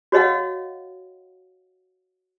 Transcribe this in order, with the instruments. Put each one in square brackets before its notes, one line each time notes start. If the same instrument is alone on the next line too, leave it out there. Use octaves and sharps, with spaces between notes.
[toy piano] F#4 C#5 D#5 F5 F#5